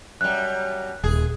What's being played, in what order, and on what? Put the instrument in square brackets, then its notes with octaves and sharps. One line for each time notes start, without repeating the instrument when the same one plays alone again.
[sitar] F#2 G3 [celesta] F#6
[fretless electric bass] D#1 [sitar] G#4